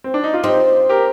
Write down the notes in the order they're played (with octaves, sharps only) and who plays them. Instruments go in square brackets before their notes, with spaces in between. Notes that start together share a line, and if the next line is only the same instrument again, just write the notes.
[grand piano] C4
D4
D#4
F4
[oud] C4 [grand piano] D#4 G4
[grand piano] G4 A#4